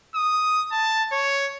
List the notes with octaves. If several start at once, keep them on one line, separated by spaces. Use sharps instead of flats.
D#6
A5
C#5